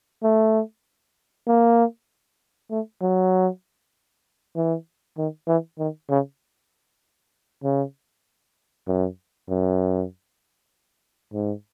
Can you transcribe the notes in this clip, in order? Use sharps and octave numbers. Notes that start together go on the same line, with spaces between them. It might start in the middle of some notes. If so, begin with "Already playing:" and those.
A3
A#3
A3
F#3
E3
D#3
E3
D#3
C#3
C#3
F#2
F#2
G#2